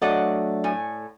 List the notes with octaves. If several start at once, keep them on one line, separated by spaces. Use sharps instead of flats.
F#3 A3 D4 D5 D#5 F#5
A2 G#5